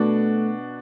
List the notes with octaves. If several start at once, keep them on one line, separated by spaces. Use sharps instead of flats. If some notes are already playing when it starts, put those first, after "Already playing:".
Already playing: B2 A3 B3 D4 F#4